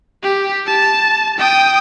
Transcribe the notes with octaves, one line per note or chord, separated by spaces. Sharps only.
G4
A5
G5 D#6